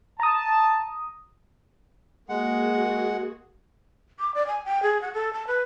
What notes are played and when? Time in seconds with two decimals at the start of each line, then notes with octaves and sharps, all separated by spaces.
0.20 A5 A#5 D#6
2.29 G#3 A#3 F#4 G#4 F#5
4.20 D6
4.34 D5
4.47 G#5
4.65 G5
4.83 G#4
5.02 F#5
5.14 A4
5.33 A5
5.47 B4